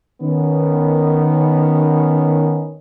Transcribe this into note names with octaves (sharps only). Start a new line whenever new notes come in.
D#3 B3 C#4